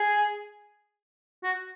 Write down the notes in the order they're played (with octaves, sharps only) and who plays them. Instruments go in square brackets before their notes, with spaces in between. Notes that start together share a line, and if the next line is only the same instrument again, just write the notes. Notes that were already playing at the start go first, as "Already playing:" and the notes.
Already playing: [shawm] G#4
F#4